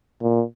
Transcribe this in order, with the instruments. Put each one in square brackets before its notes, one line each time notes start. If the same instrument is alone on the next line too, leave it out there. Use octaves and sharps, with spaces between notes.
[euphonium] A#2